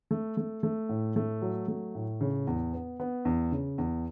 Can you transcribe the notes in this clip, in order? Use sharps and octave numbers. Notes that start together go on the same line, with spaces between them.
A3
A3
A3
A2
A3
F#3
A3
A2
C#3
E2
B3
B3
E2
C#3
E2